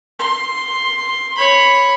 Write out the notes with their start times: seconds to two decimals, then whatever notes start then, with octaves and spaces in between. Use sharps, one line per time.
0.19 C6
1.37 C#5 B5